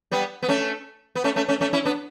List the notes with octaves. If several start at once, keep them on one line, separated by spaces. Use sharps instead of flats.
G3 B3
B3
A3 C#4
B3
A3 C#4
A3 C#4
A3 C#4
A3 C#4
C#4 E4
B3 D4